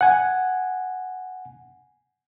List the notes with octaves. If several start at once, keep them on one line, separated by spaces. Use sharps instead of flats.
F#5 G#5